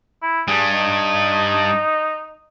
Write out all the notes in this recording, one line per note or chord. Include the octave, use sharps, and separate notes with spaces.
E4
G2 G3 G#4
D#4